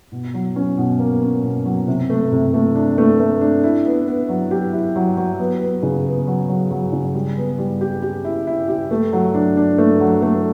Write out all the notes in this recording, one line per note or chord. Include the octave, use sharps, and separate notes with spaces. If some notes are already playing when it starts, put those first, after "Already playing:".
B2
F#3
C#4
B2
A#3
C#4
B2
F#3
C3
A3
C3
A3
D4
A3
A3
D4
E4
B3
B3
F#3
G4
E4
F#3
F#3
B3
B3
C#3
B3
F#3
F#3
F#3
C#3
G3
B3
G3
G4
G4
E4
E4
G4
A3
F#3
D4
D4
A3
F#3
A3